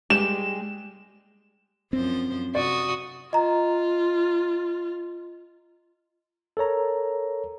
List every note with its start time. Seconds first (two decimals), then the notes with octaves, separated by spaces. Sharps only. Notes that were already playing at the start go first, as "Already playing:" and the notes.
0.10 G3 G#3 G4 E7
1.93 F#2 F3 C4 C5
2.55 C3 F#4 D5 D#6
3.33 F4 D#5 A#5
6.57 A4 A#4 C#5 A#5